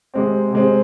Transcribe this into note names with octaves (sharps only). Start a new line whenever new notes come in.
C3 G#3 C4
C3 G#3 C4